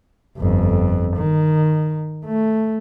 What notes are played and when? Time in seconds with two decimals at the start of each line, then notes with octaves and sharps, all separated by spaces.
0.38 G1 F2
1.16 D#3
2.25 A3